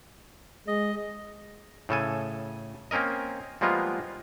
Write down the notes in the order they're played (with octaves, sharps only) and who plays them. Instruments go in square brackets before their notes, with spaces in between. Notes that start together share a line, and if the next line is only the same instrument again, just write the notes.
[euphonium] G#3 [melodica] D#5
[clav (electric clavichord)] A2 C#3 A4 G#5
A#3 C4 C#4 A#4 D#5
F3 G3 G#3 A#3 B3 F4